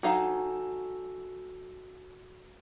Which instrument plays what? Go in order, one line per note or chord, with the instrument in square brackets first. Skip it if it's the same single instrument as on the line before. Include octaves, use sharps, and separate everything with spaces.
[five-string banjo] F#3 D#4 F5 [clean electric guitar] F#4 A4 G#5 [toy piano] F#5 A#5